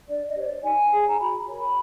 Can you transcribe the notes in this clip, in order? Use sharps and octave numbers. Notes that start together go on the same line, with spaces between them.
D4 D5
D#5
G4 C5 C#5
D5
D#4 G#5
G#4 C#5
A#5
F#4 B5
A#4 C#5 B5